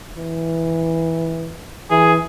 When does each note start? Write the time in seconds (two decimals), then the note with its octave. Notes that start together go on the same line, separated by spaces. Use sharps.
0.18 E3
1.91 E3 G#4